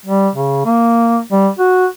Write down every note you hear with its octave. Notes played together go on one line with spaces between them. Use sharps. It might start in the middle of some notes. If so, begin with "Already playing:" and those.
G3
C#3
A#3
G3
F#4